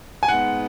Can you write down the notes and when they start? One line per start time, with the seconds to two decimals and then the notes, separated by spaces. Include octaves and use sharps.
0.23 G#5
0.28 G#2 G#3 B3 F#5